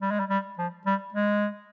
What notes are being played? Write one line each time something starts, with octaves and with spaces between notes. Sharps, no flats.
G3
G#3
G3
G3
F3
G3
G#3